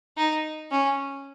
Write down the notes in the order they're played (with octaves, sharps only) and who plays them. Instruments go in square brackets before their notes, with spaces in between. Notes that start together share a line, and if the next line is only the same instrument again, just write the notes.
[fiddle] D#4
C#4